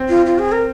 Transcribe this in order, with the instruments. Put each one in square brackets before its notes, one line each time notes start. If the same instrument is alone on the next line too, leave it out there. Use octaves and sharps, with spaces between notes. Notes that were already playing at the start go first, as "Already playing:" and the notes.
Already playing: [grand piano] C4
[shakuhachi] F4
F4
G#4
A#4